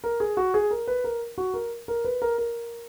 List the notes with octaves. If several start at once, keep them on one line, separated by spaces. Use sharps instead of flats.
A#4
G#4
F#4
G#4
A#4
B4
A#4
F#4
A#4
A#4
B4
A#4
A#4